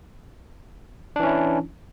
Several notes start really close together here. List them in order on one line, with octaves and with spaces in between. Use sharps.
D4 E3 C#4 E4